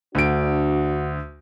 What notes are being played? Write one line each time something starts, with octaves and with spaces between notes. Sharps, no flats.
D2 D4 F#4 D7